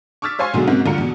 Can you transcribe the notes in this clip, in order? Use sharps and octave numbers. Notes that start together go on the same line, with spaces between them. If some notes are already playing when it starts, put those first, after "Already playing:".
C#6 D6 E6 F6 A6 B6
C5 C#5 F5 G#5 C6 C#6
B1 B2 D3 F#3 G#3 A3
G#2 C3 A#3 C4 C#4 F#4
D2 G2 D3 F4 A#5 C#7
E2 B2